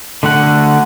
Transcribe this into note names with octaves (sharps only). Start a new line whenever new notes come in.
D3 A3 F#4 F#5